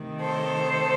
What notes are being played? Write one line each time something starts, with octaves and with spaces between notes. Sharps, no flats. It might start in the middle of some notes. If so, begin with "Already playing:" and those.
Already playing: C3 D#3 A3
A4 C5